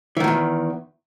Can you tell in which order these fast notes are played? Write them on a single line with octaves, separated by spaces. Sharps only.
E3 D#3 A2 E2